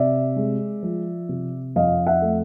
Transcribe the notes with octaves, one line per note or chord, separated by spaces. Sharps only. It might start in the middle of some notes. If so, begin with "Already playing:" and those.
Already playing: C3 D5 E5
G#3
F3
C3
F2 D#5 F5
E5 F#5
A3